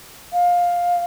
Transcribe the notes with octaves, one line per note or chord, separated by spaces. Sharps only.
F5